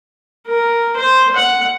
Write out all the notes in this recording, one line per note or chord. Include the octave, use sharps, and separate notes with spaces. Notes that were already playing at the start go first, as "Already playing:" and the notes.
A#4
C5
F#5